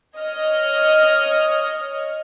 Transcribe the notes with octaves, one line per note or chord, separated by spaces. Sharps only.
C#5 D#5 F6